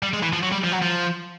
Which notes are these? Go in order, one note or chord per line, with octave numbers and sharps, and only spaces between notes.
G3
G#3
E3
F3
F#3
G3
F3
F#3
F3